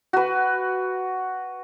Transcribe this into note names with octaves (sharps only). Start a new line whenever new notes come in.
F#4 B4